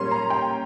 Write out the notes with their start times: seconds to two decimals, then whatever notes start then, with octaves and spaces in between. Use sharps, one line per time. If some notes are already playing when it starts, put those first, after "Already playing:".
Already playing: A#2 G3 A#3 C#4 C6
0.11 A#5
0.30 G5